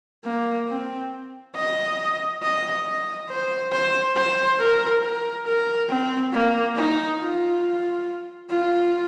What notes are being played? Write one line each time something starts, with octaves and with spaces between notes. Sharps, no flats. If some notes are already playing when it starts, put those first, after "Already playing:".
A#3
C4
D#5
D#5
D#5
C5
C5
C5
A#4
A#4
A#4
C4
A#3
D#4
F4
F4